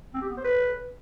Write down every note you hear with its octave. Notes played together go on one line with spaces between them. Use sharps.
C4
G4
B3
C5
B4